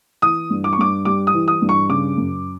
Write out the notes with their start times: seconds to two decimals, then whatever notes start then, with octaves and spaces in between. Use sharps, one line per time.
0.22 E3 D#6
0.50 G2
0.64 D6
0.73 C#6
0.78 G2 D6
1.05 G3 D6
1.27 D#6
1.34 E3
1.48 D#6
1.62 G2
1.69 C#6
1.89 C#3 D6
2.17 F#2